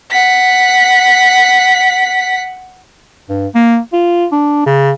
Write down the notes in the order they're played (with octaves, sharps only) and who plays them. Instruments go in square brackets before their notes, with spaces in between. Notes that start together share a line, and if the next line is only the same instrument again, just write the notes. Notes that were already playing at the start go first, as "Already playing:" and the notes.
[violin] F#5 B6
[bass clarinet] G2
A#3
F4
D4
C#3